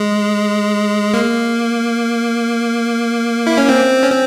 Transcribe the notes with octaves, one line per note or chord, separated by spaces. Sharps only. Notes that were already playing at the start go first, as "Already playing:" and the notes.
Already playing: G#3
A#3
E4
C#4
C4
C#4
C4